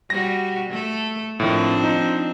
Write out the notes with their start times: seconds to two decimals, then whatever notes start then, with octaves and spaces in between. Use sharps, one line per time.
0.10 G3 F#4 A#6
0.70 A3 A4
1.40 A2 D#3 F3 C4 D4
1.84 D#4